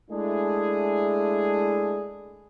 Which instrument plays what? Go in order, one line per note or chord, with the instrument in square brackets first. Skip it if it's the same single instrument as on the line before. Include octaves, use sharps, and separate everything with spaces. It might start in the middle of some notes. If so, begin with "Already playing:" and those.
[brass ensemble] G#3 A3 D4 E4 G#4